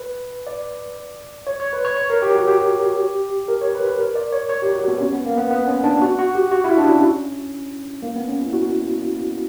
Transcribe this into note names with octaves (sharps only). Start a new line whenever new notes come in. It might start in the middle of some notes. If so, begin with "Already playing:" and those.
Already playing: B4
D5
C#5
C#5
B4
C#5
C#5
A#4
G4
F#4
G4
A#4
C#5
B4
B4
A#4
D5
C#5
C#5
G4
F#4
B3
C#4
B3
A#3
B3
B3
C#4
D4
F#4
F#4
G4
F#4
E4
D4
C#4
A#3
B3
C#4
E4
F#4